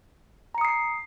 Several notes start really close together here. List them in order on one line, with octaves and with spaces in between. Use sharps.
A#5 C#7 D#6 C7